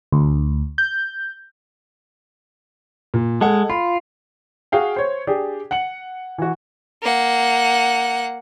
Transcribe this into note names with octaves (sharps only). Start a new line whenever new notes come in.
D2
G6
A#2
G#3 A4 F#5
F4 B5
F#4 G#4 F5 G5
C5 C#5
D4 G4 G#4 D5
F#5 C#7 F#7
E3 F#4
A#3 F#5